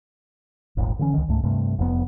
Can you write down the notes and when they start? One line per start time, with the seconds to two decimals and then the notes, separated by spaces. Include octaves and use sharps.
0.77 D#1 G#1
0.99 D3 E3 B3 C#4
1.14 C#2 D#3
1.28 C#2 G#2 A3
1.44 G2 C3 A3
1.79 F1 F2 G#2 B3